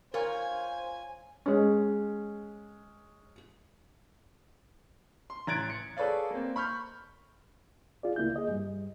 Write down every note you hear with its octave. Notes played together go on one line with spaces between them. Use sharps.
F4 A#4 C5 C#5 G#5
G#3 C#4
C6
A1 A#5 F#6 G#6 A6 D7
C#7
G#4 A4 B4 C#5 D5 F5
A#3 C4
B5 C#6 F6 G6
F4 G#4 D5
C#2 A#3 E4 G6
G#4 D#5
G2 G3